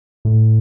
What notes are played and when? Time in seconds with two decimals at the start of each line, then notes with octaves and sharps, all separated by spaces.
0.25 A2